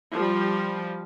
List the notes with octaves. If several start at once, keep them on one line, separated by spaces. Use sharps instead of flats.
F3 G3